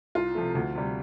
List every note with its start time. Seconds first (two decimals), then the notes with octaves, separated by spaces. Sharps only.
0.15 C2 F4
0.35 C3 F3 A3
0.55 D2
0.75 C3 G3